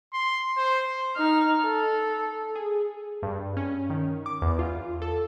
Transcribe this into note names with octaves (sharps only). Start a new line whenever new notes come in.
C6
C5
D#4 F6
A4
G#4
G2
C#4
D#3
D6
E2
F4
A4